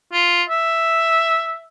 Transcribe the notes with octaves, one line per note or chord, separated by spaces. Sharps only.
F4
E5